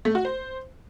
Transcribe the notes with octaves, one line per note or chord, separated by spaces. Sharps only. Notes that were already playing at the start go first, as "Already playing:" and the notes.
A3
F#4
C5